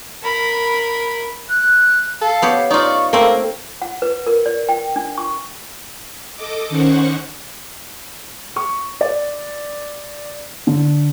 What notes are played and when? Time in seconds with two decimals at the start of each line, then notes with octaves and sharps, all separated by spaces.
0.23 A#4 B5
1.50 F#6
2.21 A4 F5
2.42 B3 G4 C#5
2.70 D#4 F4 D5 C#6
3.13 A3 A#3 C4 G5
3.82 F#5
4.02 B4
4.27 A#4
4.46 D5
4.69 G5
4.96 D4
5.18 C#6
6.35 A4 D#5 D6
6.69 D#3 C#4 C5 F#5 C#6
8.56 C#6
9.01 D5
10.67 D3